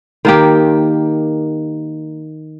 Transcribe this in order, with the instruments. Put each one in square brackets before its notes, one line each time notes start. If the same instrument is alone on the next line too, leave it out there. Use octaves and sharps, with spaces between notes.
[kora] D#3 A#3 G4